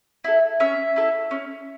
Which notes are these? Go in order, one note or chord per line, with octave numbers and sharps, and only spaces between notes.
E4 A4
C#4 E5
E4 A4
C#4